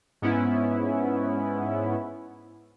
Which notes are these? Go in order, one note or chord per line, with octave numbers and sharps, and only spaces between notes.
G#2 B3 C#4 E4